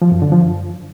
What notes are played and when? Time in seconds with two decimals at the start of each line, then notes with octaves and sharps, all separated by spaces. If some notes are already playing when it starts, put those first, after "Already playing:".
0.02 F3
0.12 F#2
0.22 D3
0.32 F3
0.42 F#2